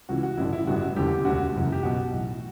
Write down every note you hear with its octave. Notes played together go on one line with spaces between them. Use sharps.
C#2 C#3 E3 F#4
F#4
A1 G2 D3 E4
E4
A1 G2 D3 F#4
E1 E2 D3 G4
E1 D2 D3 F#4
F#1 F#2 C#3 E3
G4
B1 B2 F#4
B1 A2 E3